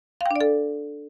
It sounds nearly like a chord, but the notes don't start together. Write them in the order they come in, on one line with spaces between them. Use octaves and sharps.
F5 G5 D4 D5 A4